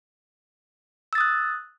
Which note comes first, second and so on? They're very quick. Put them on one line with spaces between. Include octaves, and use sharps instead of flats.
E6 A6 D#6 F#6